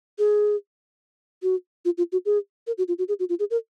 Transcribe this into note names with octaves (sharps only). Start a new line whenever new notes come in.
G#4
F#4
F4
F4
F#4
G#4
A#4
F#4
F4
F#4
G#4
F#4
F4
G#4
A#4